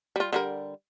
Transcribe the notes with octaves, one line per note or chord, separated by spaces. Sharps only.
G3 F4
D3 G3 A#4